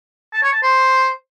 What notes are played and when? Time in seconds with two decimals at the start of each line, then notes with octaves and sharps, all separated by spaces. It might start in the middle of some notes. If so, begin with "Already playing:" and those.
0.33 A5
0.43 C#5
0.53 A5
0.63 C5